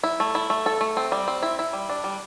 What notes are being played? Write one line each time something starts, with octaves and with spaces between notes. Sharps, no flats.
E4
A3
E4
A3
A4
A3
C4
G3
C4
E4
E4
G3
D4
G3